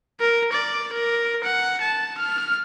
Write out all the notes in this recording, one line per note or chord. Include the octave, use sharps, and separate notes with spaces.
A#4
D5
A#4
F#5
A5
F6